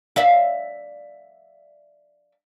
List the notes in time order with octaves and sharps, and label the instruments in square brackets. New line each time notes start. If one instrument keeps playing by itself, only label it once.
[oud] D5 E5 F5